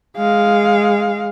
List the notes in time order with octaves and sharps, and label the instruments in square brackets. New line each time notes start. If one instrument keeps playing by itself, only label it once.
[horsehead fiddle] G#3 F5